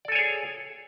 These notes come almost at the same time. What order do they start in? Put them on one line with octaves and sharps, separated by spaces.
D5 A4 G#5 C#5 G#4